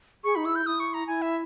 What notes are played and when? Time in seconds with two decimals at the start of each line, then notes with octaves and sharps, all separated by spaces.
0.24 G#4 C#6
0.35 D#4 B5
0.45 E4 E6
0.55 G6
0.66 E4 D#6
0.80 C#6
0.94 A#5
1.07 E4 G#5
1.22 E5